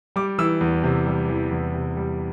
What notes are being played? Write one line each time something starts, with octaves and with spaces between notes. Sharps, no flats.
G3 D6
E3 E6
E2
C3
G3
E3
E2
C3
G3